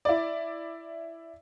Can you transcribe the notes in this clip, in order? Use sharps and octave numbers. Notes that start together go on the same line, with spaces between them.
E4 D5